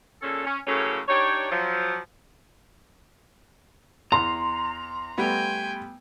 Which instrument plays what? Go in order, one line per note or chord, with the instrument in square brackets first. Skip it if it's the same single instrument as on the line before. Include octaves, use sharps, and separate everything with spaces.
[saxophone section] A#2 C#3 C#4 A4
C#4
A2 C#3 F#3 A#3 C#4 A4
D4 D#4 G4 C#5
F3 F#3
[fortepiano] E2 [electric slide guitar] A#5 [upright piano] C6
[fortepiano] G3 A3 B3 [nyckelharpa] G5 G#5